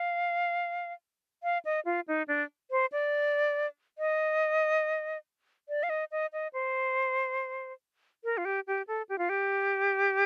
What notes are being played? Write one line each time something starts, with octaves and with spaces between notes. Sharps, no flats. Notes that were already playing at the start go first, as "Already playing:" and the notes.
Already playing: F5
F5
D#5
F4
D#4
D4
C5
D5
D#5
D5
F5
D#5
D#5
D#5
C5
A#4
F4
G4
G4
A4
G4
F4
G4